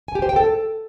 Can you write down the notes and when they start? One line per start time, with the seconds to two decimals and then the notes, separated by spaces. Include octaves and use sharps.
0.08 G#5
0.15 G4
0.22 C5
0.29 G5
0.36 A4